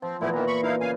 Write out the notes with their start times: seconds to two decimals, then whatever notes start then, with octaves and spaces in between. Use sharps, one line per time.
0.02 F3 C4
0.21 A#2 E3 F3 A3 B3 E4
0.33 D#3 E3 A#5
0.47 B5 C#6
0.63 D#4 E4 F5
0.81 C#3 F5 G#5